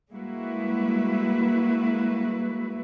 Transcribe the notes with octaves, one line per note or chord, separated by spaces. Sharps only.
G3 G#3 A#3 E4 F#4 B4